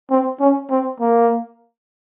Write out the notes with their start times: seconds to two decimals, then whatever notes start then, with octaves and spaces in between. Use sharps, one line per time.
0.10 C4
0.40 C#4
0.70 C4
1.00 A#3